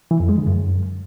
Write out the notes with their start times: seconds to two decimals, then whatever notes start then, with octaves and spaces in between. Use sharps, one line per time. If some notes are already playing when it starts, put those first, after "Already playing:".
0.11 E3
0.20 F2
0.29 G#3
0.38 D3
0.47 F#2